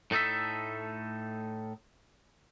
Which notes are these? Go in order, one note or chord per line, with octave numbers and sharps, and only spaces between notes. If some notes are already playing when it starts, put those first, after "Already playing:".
A2 A3 D#4 A4 E5